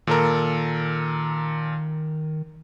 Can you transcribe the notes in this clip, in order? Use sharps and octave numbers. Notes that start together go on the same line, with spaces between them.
A#2 D#3 A4 A#4